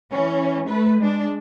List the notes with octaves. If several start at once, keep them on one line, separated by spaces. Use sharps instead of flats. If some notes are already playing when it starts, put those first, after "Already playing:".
E3 C#4
A3 B4
G#3 D4